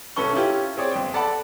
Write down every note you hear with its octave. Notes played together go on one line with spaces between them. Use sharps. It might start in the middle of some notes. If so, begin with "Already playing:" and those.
C2 C#4 A4 B4 C#6 G7
C#4 E4 F4 G4
C4 G#4 C#5 D5
G1 C4 G5
A4 D5 F#5 A5 B5